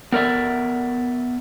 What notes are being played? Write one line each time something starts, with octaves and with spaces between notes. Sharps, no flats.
B3 A#4 D5 E5